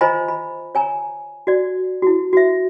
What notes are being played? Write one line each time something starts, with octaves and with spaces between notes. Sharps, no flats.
F4 C5 D#5 G#5 A#5 B5
B5
C#5 G#5 A#5
F#4 D5
E4 F#4
F#4 E5